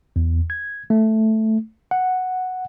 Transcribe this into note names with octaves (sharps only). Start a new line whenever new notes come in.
E2
G#6
A3
F#5